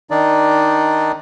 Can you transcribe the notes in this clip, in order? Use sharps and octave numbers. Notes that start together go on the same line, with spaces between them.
D#3 D4 D#4 D5